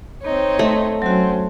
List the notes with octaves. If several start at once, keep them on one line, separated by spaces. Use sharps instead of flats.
C4 D#4 C#5
A3
F#3 C4 C#4 F#4